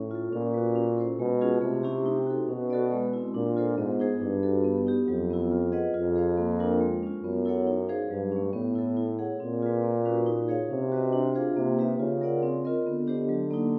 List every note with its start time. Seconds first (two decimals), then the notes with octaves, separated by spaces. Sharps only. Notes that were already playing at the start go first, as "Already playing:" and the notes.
Already playing: A2 C#4
0.11 F4 A4
0.32 A#2 C#4
0.54 F#4 B4
0.76 C#4
0.97 E4 A4 C5
1.19 B2 G#3
1.41 C#4 F4 G#4
1.61 C3 A3
1.83 C#4 E4 G4
2.06 D#4
2.26 F#4 A4
2.49 B2 C#4
2.70 F#4 A4 D5
2.92 G#3
3.13 C4 E4
3.34 A#2 D4
3.56 F4 A4 C5
3.78 G#2 B3
4.00 D#4 G#4 C5
4.21 G2 D4
4.43 F#4 A4
4.64 B3
4.87 D#4 G4
5.08 F2 F#3
5.30 B3 E4
5.52 F4
5.72 G#4 B4 D#5 F#5
5.94 F2 F4
6.16 G#4 C5 F5
6.37 A#3
6.59 D4 F4 A#4
6.81 G#3
7.03 C#4 F4
7.24 F#2 B3
7.46 E4 A4 C#5 F#5
7.67 D#4
7.89 G#4 C5 F5
8.10 G2 F#3
8.32 A3 C#4
8.53 A2 B3
8.75 E4 A4
8.97 E4
9.19 G#4 C#5 F#5
9.40 A#2 C4
9.62 F4 G#4 B4
9.84 A#3
10.05 C#4 F#4 B4
10.26 D#4
10.48 G#4 C#5 F5
10.71 C3 C#4
10.92 F#4 B4 D#5
11.13 D4
11.35 F4 G#4 C5 F5
11.56 C3 A#3
11.78 D#4 G4 B4 E5
11.99 C#3 F4
12.21 A#4 D5 F#5
12.43 C4
12.64 F4 A#4 D#5
12.86 D3 B3
13.07 D4 G4 C5 D#5
13.29 F#3
13.51 A#3 D#4